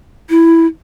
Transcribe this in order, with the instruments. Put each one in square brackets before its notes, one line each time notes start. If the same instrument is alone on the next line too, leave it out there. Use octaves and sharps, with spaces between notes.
[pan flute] E4